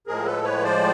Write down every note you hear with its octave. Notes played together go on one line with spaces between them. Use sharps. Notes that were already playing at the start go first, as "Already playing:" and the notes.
A2 F3 G#3 G#4 A#4
A4 B4
B4 C#5
C5 D5